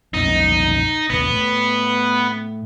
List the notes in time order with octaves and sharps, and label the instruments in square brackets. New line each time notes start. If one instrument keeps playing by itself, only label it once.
[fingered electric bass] B1 F2 B2 [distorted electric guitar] D#4
[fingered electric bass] A1 D#2 [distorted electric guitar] B3
[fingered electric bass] A2